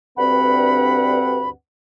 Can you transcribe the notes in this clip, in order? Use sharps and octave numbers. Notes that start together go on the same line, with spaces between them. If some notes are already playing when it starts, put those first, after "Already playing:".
D2 G2 C4 B4 F#5 B5